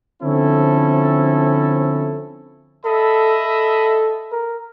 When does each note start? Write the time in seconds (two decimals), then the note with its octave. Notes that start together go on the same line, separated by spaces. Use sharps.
0.23 D3 F3 C4 C#4 E4 A4
2.85 A4 D#5 E5 B5
3.46 A4
4.32 A#4